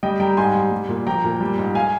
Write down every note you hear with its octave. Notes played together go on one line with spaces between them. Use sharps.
G3 D#5 G5
G3 G5 A#5
G#2 G#5 C6
G3
G3
A#2
F3 G5 A#5
A#2
G3
G#2
F5 G#5